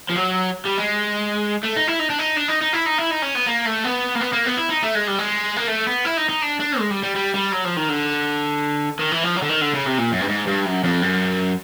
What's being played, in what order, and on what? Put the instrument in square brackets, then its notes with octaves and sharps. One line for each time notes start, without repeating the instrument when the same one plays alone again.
[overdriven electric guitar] F3
F#3
G3
G#3
A3
D#4
E4
D#4
D4
D#4
D4
D#4
D#4
E4
D#4
E4
D#4
C#4
B3
A#3
A3
B3
A#3
B3
A#3
B3
E4
D#4
A3
G#3
G3
G#3
A#3
A3
B3
E4
D#4
D#4
D4
D4
G#3
G3
G3
G3
G3
F#3
F3
D#3
D3
D#3
E3
F3
F#3
D3
D#3
D3
C#3
C3
A#2
F#2
G2
G#2
G2
F#2
F2
F#2